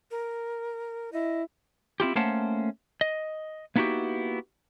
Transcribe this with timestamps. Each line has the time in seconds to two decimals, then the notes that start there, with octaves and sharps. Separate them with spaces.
0.11 A#4
1.13 E4 D#5
2.00 C4 E4 F4 G4
2.16 A3 A#3 C#4 C5 F#5 A5
3.01 D#5
3.76 A#3 B3 D#4 E4 F#4 G4